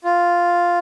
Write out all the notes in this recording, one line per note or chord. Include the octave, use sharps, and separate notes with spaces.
F4